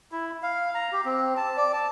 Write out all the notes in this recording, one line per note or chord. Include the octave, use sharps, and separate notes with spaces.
E4
F5
A#5
G4
C4
A5
D5
A5